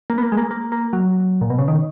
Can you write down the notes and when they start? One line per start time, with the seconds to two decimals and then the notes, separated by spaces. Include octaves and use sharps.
0.10 A#3
0.18 B3
0.23 A#3
0.32 G#3
0.37 A#3
0.51 A#3
0.72 A#3
0.93 F#3
1.41 A#2
1.50 B2
1.59 C#3
1.68 D#3